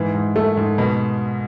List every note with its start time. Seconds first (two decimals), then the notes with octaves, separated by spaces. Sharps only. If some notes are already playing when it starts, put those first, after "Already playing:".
Already playing: G#2 E3
0.15 G#2
0.36 A3
0.57 G#2
0.78 B2